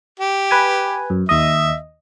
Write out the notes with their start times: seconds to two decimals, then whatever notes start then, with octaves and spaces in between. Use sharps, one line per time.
0.19 G4
0.51 B4 G#5
1.10 F#2
1.29 D#2 D#5 E5